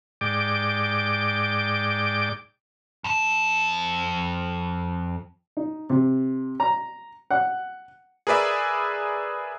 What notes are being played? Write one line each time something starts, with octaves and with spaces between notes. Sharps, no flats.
G#2 D5 G5 D6
F2 A5
D#4
C3
A#5
F#5
G#4 A#4 B4 D5 E5